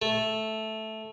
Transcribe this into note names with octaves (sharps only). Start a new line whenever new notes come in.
A3